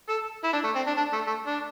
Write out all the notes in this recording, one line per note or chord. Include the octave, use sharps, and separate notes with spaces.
A4
E4
D4
A3
C4
D4
D4
A3
A3
D4